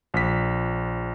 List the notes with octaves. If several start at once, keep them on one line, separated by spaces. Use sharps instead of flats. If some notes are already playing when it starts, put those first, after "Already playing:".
A#1 B6